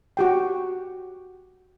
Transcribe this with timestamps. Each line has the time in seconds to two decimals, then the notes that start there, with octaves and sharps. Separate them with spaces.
0.17 F#4 G4 G5